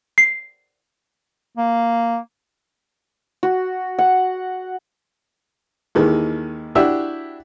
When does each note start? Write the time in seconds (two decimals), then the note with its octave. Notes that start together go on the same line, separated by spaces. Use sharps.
0.18 C7
1.57 A#3
3.43 F#4
3.99 F#5
5.95 D#2 D#3 E3 G#3
6.75 D4 E4 F#4 G4 E5